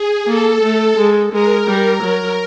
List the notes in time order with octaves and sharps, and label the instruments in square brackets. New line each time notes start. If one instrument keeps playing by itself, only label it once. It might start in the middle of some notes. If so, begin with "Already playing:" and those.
Already playing: [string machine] G#4
[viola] A#3 [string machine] A4
[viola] A3
G#3
[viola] G#3 [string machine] A#4
[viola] G3
F#3